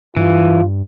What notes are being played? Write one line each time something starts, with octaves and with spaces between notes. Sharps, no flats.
G2 E3 F4